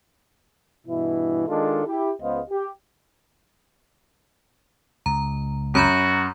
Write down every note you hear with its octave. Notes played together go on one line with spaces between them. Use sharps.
G2 B2 E3 E4
D#3 G#3 D4 F4 A4
E4 G4
C#2 G#3 B3 C5 D#5 F5
G4
C#2 A#5
F#2 F#4 A#5 B5 G6